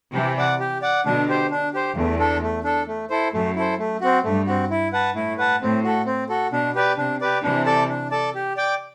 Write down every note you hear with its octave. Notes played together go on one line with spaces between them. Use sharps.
C3 E3 G4
D5 F#5
G4
D5 F#5
B2 D3 D4
G4 C5
D4
G4 C5
E2 A3
D4 A4
A3
D4 A4
A3
E4 A4 C5
F#2 A3
E4 A4 C5
A3
C4 F#4
G2 A3
C4 F#4
E4
B4 F#5 A5
A2 E4
B4 F#5 A5
A2 C4
F#4 A4
C4
F#4 A4
B2 D4
G4 B4 D5
C3 D4
G4 B4 D5
C3 E3 D4
A4 D5 A5
D4
A4 D5 A5
G4
D5 G5